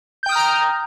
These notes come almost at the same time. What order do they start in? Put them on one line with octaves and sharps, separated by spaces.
G6 G5 D#6 F6 A#5